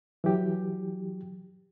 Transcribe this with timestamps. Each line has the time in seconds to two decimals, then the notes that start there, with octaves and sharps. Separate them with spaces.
0.24 E3 F#3 G4